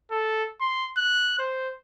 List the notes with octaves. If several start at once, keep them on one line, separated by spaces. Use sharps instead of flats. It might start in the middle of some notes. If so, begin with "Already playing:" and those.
A4
C6
F#6
C5